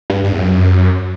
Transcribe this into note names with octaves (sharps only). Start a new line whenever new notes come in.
G2
G2
E2
F#2